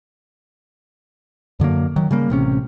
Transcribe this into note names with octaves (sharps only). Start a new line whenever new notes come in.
F#2 D3 F#3 A#3
D#3 F#3
C#3 G3 A#3
A1 C3 C#4